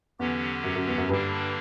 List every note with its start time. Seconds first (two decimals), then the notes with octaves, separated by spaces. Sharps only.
0.19 E2 D3 F#3 C#4 G4
0.64 F#2
0.75 F#2
0.87 E2
0.98 F#2
1.09 G2 D3 G3 A#3 D4